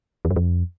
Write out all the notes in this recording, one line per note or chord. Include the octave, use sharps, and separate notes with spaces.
E2
F#2
F2